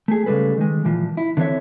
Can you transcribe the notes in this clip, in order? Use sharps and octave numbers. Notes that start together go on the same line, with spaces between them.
A3 G#4
C#3 G3 G#3 A4 B4
D#3 G#3
A#2 E3 F3
E4
D3 E3 C4 C5 C#5 E5